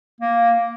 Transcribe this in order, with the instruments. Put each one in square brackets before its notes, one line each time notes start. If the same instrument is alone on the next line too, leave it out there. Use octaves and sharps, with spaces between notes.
[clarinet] A#3